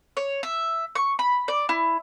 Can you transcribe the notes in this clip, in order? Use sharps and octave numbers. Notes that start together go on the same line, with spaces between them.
C#5
E5
C#6
B5
D5
E4